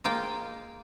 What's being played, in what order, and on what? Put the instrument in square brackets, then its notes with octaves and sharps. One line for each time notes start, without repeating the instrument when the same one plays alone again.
[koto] G#3 A#3 F4 G5